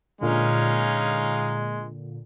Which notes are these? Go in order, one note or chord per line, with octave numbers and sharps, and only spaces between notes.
A#2 D3 G#3 C#4 D#4 F5